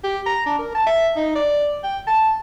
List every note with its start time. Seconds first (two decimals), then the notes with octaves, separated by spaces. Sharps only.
0.04 G4
0.26 A#5
0.46 D4
0.59 A#4
0.75 A5
0.86 E5
1.16 D#4
1.35 D5
1.83 G5
2.07 A5